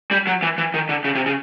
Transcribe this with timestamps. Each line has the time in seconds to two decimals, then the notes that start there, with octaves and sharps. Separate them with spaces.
0.11 G3
0.27 F#3
0.42 E3
0.58 E3
0.74 D#3
0.89 D3
1.04 C#3
1.15 C3
1.26 C#3